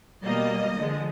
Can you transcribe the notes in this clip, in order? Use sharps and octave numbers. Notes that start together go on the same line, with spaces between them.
B2 G3 A#3 D#5
D3 F3 G#3